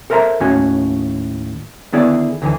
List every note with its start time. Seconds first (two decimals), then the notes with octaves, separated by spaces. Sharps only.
0.10 A4 A#4 C5 E5 A5 A#5
0.40 D#2 A2 C#4 F#4 G#5
1.93 D3 D#3 B3 E4 G#4 D5
2.42 D2 D3 E3 G#5